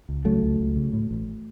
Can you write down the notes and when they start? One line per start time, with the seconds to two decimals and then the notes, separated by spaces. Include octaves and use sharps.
0.09 C#2
0.25 C#3 F#3 A3
0.43 C#2
0.60 C#2
0.76 C#3
0.93 A2
1.11 A1